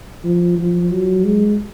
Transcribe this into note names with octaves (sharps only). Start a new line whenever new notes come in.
F3
F3
F#3
G#3